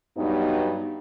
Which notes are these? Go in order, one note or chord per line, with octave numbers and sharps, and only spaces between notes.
G2 F#3 G3 B3 D#4